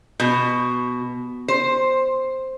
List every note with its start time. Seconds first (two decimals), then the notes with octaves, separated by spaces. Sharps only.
0.20 B2
1.48 C5